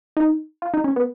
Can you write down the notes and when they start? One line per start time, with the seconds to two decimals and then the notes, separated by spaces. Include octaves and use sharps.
0.17 D#4
0.62 F4
0.74 D#4
0.84 C#4
0.96 B3